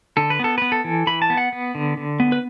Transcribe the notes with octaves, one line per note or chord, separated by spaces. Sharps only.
D3 A4
B4
B3 A4
B3 B4
A4
E3
E3 B5
A5
B3
F#5
B3
D3
D3
B3
B4